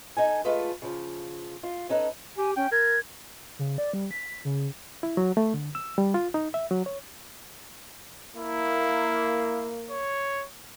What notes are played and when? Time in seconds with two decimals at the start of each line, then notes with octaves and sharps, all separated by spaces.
0.17 D#4 A4 G#5
0.45 G#3 A3 F4 A4 B4
0.82 C#3 F3
1.63 F4
1.89 C#4 D#4 A4 B4
2.37 G4 G#5
2.56 C#4 G5
2.72 A#4 G#6
3.59 C#3
3.78 D5
3.93 G3
4.11 B6
4.45 C#3
5.03 E4
5.17 F#3
5.37 A3
5.54 D3
5.75 E6
5.98 G3
6.14 F4
6.34 D#4
6.54 E5
6.71 F#3
6.86 C#5
8.36 A#3 E4
9.90 C#5